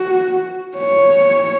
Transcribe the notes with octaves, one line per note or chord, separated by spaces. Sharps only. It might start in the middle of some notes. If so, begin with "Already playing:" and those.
Already playing: F#4
C#5